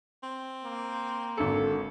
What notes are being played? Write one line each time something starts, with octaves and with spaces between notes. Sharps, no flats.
C4
A#3
G#1 D3 A4 C#7